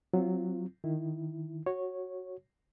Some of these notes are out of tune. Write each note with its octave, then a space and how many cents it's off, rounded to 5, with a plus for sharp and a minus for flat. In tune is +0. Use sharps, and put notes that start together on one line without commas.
F#3 +0 C4 +0 F4 -20
D#3 +0 E4 +0
F#4 +0 C#5 -10